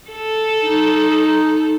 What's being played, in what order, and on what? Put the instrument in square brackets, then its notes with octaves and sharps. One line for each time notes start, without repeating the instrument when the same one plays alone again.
[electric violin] A4
[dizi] D#4